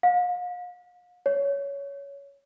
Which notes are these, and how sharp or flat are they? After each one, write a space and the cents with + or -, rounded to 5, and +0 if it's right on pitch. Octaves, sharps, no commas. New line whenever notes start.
F5 +40
C#5 +15